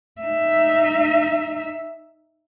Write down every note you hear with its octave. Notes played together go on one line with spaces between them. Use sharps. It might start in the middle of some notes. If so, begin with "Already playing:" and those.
D#4 E5